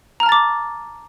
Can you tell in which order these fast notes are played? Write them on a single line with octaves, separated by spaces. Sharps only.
A#5 F6 A5 A6 D6